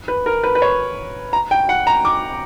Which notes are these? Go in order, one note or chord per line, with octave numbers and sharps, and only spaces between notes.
B4
A#4
B4
B4
C#5
A#5
G5
F#5
A#5
D6